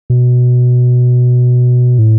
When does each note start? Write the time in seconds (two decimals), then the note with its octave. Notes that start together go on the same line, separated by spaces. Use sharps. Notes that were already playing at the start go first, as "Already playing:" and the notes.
0.10 B2
1.99 A2